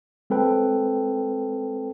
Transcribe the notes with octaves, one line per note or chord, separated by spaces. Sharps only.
G#3 C4 A4 B4 G5